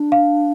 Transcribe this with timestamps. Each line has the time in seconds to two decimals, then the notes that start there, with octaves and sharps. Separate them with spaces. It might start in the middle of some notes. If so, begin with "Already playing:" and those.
Already playing: D4
0.12 F5